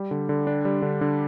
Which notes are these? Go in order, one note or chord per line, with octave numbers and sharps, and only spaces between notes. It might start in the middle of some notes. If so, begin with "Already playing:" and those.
Already playing: G3
D3
D3
D4
G3
D3
D3